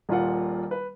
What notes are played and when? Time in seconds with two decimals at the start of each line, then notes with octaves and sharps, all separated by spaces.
0.09 D#1 A#2 F4 F#5
0.71 B4